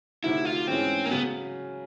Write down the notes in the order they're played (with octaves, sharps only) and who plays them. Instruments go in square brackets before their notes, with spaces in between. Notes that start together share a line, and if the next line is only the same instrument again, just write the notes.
[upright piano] D2 C3 D#3 F#3 [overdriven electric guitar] E4
[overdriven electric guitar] F4
[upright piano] G#2 E3 G#3 C#4 [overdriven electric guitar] C4
[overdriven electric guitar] A#3
[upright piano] C#3 F#3 [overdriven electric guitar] B3